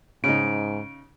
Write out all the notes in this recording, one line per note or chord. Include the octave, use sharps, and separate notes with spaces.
G#2 C#3 D#4 D7